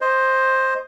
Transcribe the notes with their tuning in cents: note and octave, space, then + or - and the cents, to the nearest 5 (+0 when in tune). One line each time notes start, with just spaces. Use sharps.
C5 +10 D#5 +0